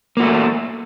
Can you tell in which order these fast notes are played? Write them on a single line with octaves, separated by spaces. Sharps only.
A#3 F#4 A3